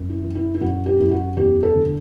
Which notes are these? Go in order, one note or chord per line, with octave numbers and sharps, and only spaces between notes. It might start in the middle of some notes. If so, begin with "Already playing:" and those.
Already playing: F#2
E4
E3
E4
E4
F#2 F#4
G4
F#2 E4
F#4
E2 G4
A4
D3